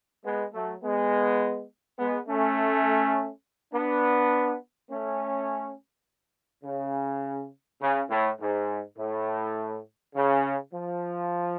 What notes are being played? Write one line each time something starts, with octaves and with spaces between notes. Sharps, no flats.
G#3 B3
F#3 A3
G#3 B3
G#3 B3
A3 C#4
B3 D4
A3 C#4
C#3
C#3
A2
G#2
A2
C#3
F3